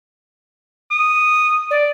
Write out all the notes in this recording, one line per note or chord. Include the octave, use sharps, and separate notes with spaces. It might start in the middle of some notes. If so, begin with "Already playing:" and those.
D#6
D5